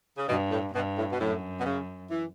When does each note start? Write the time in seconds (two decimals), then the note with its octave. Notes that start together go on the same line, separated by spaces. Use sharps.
0.17 C#3
0.28 G2 B2
0.51 A2
0.74 G2 B2
0.97 A2
1.11 B2
1.19 F#2 A2
1.59 B2
1.65 C#3
2.10 E3